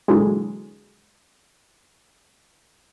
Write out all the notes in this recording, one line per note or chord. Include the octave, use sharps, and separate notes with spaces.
A#2 D3 E3 F#3 G#3